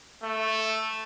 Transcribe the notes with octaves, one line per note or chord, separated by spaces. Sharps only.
A3